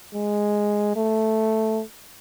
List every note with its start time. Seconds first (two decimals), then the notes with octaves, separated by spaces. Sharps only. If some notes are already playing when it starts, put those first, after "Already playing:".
0.15 G#3
0.96 A3